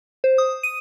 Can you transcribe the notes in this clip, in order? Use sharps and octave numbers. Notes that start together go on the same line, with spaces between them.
C5
D#6
D#7